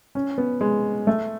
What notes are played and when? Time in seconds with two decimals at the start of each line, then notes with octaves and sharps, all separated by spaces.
0.15 C#4
0.38 B3
0.61 G#3
1.07 A3